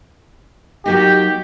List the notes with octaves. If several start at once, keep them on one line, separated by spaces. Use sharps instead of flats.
F#3 A#3 D#4 G4